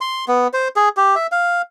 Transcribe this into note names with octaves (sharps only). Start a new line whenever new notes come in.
C6
B3
C5
G#4
G4
E5
F5